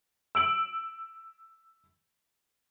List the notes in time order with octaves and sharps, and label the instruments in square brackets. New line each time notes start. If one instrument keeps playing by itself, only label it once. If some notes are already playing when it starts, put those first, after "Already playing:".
[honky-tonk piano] E6 D7 F#7